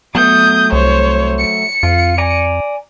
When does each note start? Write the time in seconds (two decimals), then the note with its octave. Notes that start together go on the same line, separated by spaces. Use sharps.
0.15 F#3 A3 B3 D#6 G6
0.72 C2 C5 C#5
1.38 C#7
1.83 F2 F4
2.18 D5 G#5 A#5